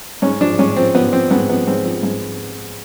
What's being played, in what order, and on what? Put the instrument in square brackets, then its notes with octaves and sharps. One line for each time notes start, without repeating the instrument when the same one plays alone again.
[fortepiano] G#2 C#4
F3 D4
G#2 C#4
F3 C4
F3 B3
F3 C4
G#2 B3
F3 B3
G#2 C4
F3
G#2